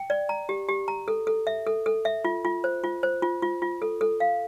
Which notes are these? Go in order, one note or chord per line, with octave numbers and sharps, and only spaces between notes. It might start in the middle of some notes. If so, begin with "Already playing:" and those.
Already playing: G5
D5
A#5
G4
G4
A#5
A4
A4
E5
A4
A4
E5
F4
F4
C5
F4
C5
F4
F4
F4
A4
A4
F5